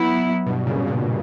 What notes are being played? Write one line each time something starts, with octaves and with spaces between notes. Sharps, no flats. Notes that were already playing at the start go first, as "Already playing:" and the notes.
Already playing: F#3 B3 E4
G2 B2
A#2 C#3
G2 B2